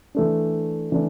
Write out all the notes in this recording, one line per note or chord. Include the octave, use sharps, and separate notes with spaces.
E3 A3 D4
E3 A3 D4